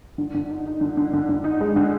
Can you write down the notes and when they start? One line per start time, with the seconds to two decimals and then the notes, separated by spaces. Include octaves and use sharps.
0.18 D3
0.34 D3
0.50 D#4
0.66 D#4
0.81 D3
0.97 D3
1.13 D3
1.29 D3
1.44 D#4
1.61 G#3
1.76 D3